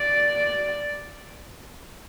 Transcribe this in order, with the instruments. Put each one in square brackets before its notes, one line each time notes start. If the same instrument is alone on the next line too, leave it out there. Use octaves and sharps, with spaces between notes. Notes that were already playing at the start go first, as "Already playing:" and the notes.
Already playing: [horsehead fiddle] D5